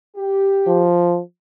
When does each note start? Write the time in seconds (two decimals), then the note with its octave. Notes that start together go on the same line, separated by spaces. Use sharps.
0.16 G4
0.67 F3